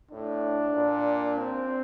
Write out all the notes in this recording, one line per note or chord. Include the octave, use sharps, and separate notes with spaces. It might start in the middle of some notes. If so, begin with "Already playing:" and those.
A2 D4
A#2
C4